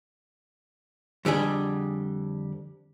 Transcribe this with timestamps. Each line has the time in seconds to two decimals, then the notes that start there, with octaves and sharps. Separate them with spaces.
1.25 F2 D3 G3 G#4